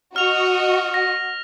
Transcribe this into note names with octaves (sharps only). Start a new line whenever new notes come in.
F#4 D#5 F6 F7
A#6